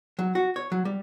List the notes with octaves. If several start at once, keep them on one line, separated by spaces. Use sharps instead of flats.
F#3
F#4
C#5
F#3
G3